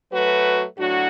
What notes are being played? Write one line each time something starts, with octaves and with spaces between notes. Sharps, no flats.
F#3 A3 F#4 B4
A2 F#3 D4 F#4